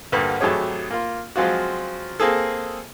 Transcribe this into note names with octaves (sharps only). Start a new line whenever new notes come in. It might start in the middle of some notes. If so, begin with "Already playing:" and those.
D2 G2 D3 A#3
G#1 F#3 A3 G4 G#4 C#5
A#3 F4
F3 F#3 G#3 C4 F4 F#4
A#3 C4 G#4 A4